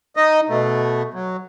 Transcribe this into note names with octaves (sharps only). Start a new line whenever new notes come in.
D#4 D#5
B2 A3
F#3